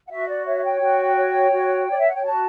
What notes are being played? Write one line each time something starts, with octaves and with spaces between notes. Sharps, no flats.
F#5
F#4 E5
D5
C#5 E5
G5
F#4
C#5
F#4
C#5 D5
E5
F#5
G5
F#4 A5